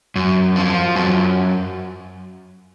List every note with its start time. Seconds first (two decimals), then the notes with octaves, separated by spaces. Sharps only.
0.16 F#2
0.56 F3
0.96 F#2